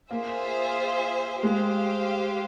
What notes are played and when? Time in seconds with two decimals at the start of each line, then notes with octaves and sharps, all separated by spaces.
0.10 A#3 F4 G#4 C5 E5
1.43 G#3 G4 C5 F5